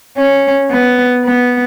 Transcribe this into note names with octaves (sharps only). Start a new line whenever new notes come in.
C#4
B3
B3